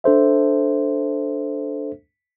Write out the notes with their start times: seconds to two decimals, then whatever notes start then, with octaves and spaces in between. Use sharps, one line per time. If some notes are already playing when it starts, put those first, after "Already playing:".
0.04 D4 A4 C5 E5